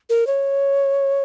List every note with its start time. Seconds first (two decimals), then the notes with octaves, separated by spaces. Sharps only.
0.10 A#4
0.27 C#5